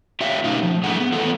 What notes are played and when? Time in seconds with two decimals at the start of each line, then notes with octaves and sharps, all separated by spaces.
0.21 F4 G4 C#5 E5 F5 G5
0.44 B2 A3 C#4 D#4 F4
0.63 F3
0.83 G3 A3 G#4 F#5 G#5
1.00 B3
1.13 E3 A3 B3 F4 A4